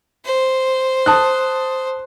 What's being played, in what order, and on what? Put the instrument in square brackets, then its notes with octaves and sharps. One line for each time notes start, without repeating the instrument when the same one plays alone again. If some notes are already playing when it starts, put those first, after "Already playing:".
[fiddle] C5
[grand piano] A5 D#6 F#6